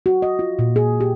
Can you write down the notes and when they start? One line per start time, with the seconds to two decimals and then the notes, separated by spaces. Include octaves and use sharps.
0.06 F#4
0.22 D#5
0.39 F4
0.59 A#2
0.76 G#4
1.01 G4